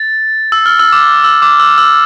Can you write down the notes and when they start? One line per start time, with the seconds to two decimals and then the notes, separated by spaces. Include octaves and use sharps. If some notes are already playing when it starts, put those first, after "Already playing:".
Already playing: A6
0.52 E6
0.66 F6
0.79 E6
0.92 D6
1.24 E6
1.42 D6
1.60 E6
1.78 E6